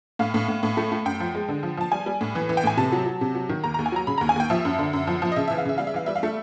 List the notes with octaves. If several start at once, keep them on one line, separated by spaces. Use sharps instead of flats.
A2 F5
A2
A2
A2
A3
A3
F#2 G5
F3
G#3
D3
F3
F3 A5
G3 G#5
G3
A2
E3
E3
G5
A2 G#5
C3 A5
F#3
F#3
C3
F#3
D#3
D#2 A#5
D#2 A#5
G#5
F#3 A#5
C#3 B5
D#2 A#5
G#5
D#2 G5
F3 E5
F#2
D3
F#2
F3
F3
D#5
C#3 E5
E3 E5
F5
C#3 E5
G3 F5
E5
E3 F5
G3 E5
F5
A3 E5